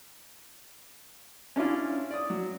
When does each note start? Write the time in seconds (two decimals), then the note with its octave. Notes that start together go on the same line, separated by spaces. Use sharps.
1.56 C#4 D4 E4 F4
2.11 D5 D#6
2.30 F#3